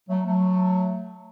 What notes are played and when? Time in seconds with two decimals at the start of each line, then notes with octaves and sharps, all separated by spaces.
0.09 F#3 A3
0.25 F#3 A3